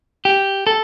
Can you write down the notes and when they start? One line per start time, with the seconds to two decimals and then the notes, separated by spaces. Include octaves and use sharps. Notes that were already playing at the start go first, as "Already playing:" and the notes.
0.25 G4
0.67 A4